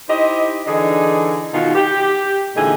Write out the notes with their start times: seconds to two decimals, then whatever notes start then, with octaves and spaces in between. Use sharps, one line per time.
0.09 D#4 E4 G4 C5 D#5
0.67 D3 E3 D4 D#4 G#4
1.54 B2 D#3 D#4 F4 F#4 G#4
1.75 G4
2.56 A#2 D3 E3 G#3 D#4 G#4